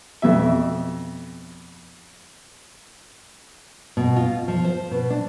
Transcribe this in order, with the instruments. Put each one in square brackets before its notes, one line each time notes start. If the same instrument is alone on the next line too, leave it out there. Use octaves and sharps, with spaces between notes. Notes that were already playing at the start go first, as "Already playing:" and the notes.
[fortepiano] F2 B2 E5
[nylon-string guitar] B2
F4
F3
C5
B2
D4